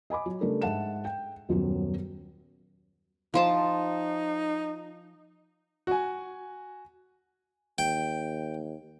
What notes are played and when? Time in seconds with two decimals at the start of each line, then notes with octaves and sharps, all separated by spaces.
0.10 D#5 G#5 B5 D6
0.26 F#3
0.41 C#3 G3 A3 D4 A#4
0.62 G#2 E5 F#5 A5 E7
1.05 G5
1.49 D#1 F#2 F#3 B3 F#4
3.34 F3 D#4 F4 A5
5.87 F#4 G#5
7.78 D#2 G5